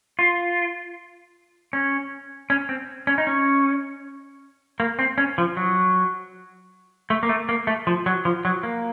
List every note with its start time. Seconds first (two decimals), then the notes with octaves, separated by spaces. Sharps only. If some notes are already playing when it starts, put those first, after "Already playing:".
0.19 F4
1.73 C#4
2.50 C#4
2.69 C4
3.07 C#4
3.18 D#4
3.27 C#4
4.80 A#3
4.99 C4
5.18 C#4
5.38 F3
5.57 F#3
7.10 A3
7.23 A#3
7.29 A3
7.49 A#3
7.67 A3
7.87 F3
8.06 F#3
8.25 F3
8.45 F#3
8.63 A#3